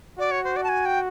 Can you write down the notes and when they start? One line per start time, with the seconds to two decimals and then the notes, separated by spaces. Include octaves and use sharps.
0.18 F#4 D5
0.31 C#5
0.44 C5
0.56 D5
0.64 A5
0.69 G#5
0.85 G5